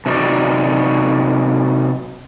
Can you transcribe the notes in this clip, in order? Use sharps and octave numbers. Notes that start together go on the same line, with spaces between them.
C3 F#3 D#4 F#4 D5